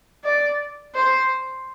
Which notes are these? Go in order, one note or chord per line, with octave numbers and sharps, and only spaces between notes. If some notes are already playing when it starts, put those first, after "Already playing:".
D5
C5